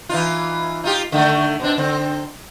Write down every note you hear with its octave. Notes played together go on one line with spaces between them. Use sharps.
E3 D#4 F4
D#4 F4 G4
D3 D#3 A3
B2 C4 D4
D3 C4